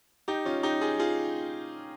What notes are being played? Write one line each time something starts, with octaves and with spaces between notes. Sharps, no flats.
D#4 G4
C#4 F4
D#4 G4
F4 G#4
F4 G#4